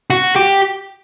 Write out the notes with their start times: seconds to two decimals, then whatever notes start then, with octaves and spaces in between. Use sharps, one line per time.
0.10 F#4
0.36 G4